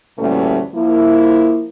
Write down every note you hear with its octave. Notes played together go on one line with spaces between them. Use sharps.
D2 A#2 E3 G3 A3 C#4
F3 A#3 E4